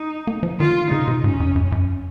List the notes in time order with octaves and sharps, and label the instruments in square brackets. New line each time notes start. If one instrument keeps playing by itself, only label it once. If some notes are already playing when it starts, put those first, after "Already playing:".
Already playing: [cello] D#4
[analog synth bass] A#3
F3
[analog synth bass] D#3 [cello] F4
[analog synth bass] C#3 [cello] D#4
[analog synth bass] C3
[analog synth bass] G#2 [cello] C#4
[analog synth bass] F2
F#2
F#2